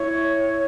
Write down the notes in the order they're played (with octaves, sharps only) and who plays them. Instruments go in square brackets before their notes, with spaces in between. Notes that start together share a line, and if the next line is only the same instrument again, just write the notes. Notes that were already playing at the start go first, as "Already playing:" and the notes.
Already playing: [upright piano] E4 [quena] C#5